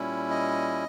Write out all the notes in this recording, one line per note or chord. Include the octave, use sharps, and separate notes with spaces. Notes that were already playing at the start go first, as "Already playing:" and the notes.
Already playing: A#2 G3 C#4 E4
D#5